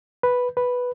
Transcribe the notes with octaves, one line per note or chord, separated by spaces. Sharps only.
B4
B4